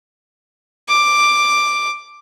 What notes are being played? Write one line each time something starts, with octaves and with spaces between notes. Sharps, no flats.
D6